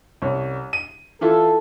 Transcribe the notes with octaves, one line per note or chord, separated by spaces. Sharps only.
C2 C#4
D#7
E3 E4 F4 A4